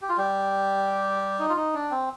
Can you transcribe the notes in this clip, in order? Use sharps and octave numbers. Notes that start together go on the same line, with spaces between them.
G4
F4
G3 G4
D#4
F4
D#4
D4
C4